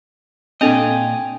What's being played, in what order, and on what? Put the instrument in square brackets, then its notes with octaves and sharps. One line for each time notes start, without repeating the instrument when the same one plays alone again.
[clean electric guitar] A#2 D#5 [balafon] C4 D4 A4 [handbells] G5 G#5 G#6